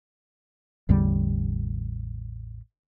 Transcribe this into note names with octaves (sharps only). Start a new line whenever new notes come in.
A1 E2 D3 G3